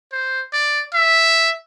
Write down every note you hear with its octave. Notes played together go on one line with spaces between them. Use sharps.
C5
D5
E5